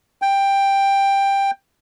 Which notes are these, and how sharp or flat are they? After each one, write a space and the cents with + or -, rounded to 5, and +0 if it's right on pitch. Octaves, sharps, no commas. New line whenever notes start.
G5 +10